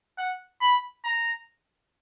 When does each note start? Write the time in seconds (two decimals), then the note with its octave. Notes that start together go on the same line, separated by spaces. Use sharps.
0.18 F#5
0.61 B5
1.05 A#5